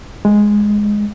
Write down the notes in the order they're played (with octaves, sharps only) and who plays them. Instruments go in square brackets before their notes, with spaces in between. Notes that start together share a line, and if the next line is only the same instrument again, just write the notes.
[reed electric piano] G#3